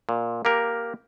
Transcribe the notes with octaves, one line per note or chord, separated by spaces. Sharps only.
A#2
A#3 G4 A#4